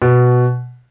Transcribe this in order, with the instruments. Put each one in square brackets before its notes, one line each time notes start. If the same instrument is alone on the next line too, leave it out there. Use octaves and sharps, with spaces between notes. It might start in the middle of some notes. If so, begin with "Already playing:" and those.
[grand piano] B2